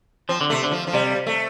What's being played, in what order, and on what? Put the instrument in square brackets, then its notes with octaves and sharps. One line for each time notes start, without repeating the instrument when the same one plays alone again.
[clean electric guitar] F3 [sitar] C4
[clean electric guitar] D3
[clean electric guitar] C3 [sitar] A3
[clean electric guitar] D3
[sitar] F3
F3
[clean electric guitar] C3 [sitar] G3
[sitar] A3